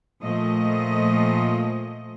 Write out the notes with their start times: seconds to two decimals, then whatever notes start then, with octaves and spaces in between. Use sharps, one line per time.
0.22 A#2 F3 A3 D#5